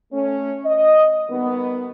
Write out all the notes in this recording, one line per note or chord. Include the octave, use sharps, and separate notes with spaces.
A3 C#4
D#5
D#3 G3 B3